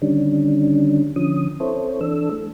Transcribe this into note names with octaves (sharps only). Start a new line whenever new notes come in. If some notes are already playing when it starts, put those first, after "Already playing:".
D3 D#3 G3 C#4 D4
D3 F3 C#4 D#6
C4 E4 A4 C5 C#5
E3 D4 A4 E6
A3